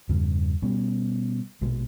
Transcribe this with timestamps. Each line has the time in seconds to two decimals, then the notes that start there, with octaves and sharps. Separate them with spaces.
0.09 E2 G2 C#3
0.62 B2 G3 B3 C#4
1.61 A#1 B2 G#3